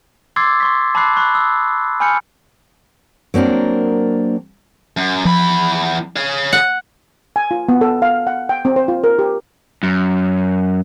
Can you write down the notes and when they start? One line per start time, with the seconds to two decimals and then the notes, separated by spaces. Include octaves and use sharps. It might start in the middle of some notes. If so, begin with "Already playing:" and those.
0.36 C6 D6 E6 G#6 A6 C7
0.60 C6 C#6 B6
0.95 A5 B5 D6 E6 F#6 C7
1.16 B5 C#6 F#6
1.35 D#6 E6
2.00 G#5 B5 F6 G6 C#7
3.34 F#3 A#3 C4 D4 A#4
4.97 F#2
5.25 E2 F3 B5
6.16 C#5 F5
6.53 F#5
7.36 G#5
7.51 F4
7.69 B3
7.81 A4
8.02 F5
8.27 F#5
8.49 G5
8.65 C4
8.76 C5
8.88 F4
9.04 A#4
9.19 G4
9.83 F#2